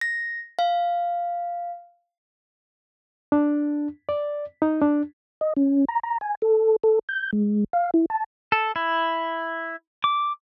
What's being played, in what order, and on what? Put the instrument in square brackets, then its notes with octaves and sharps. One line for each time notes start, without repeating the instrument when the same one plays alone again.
[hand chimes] A#6
F5
[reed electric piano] D4
D5
D#4
D4
[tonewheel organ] D#5
C#4
A#5
A#5
G#5
A4
A4
G6
G#3
F5
E4
A5
[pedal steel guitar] A4
E4
D6